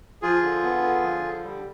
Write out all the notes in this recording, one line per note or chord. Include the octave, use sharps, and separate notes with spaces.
F3 F4 G#4
D3
B3
D3
F3
D3
G3